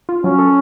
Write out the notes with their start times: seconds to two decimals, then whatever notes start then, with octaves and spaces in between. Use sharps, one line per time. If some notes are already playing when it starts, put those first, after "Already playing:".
0.09 F4
0.24 F#3 C#4
0.39 A4